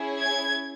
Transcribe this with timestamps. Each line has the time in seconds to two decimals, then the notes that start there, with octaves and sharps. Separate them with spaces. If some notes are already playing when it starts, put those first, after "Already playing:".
Already playing: C#4 E4 G#4
0.20 G#6